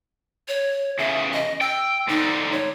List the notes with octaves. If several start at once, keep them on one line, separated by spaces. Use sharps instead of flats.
C#5
E2 C#3 E5
D#5
G5 E6
G#2 D3 D#4
C#5